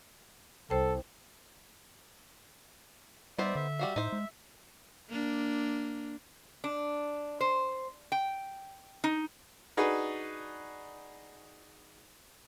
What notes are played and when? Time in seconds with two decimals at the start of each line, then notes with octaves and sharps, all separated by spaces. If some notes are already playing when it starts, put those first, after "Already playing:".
0.70 C2 A4 C5 G5
3.38 G3 B3 D#4 C5 D5 E5
3.55 D3 E5
3.79 G3 F#4 F5
3.96 A2 D#4 C5
4.12 G#3
5.09 A#3 D4
6.64 D4
7.41 C5
8.12 G5
9.04 D#4
9.77 D4 D#4 F#4 G#4 B4